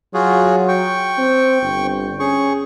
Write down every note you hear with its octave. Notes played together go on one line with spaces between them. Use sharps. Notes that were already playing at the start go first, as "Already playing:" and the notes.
F#3 F4 F#4 G#4
G5 C#6
C4
G1
C#4 G#4 C#6